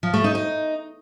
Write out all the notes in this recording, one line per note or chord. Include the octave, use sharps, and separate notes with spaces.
F3
A3
D#4
D#4